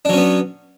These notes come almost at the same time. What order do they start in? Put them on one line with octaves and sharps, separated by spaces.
D4 F#3 C#4 B3